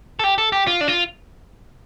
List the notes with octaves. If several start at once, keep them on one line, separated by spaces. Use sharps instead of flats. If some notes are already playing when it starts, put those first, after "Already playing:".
A4
G4
A4
G4
F4
D4
F4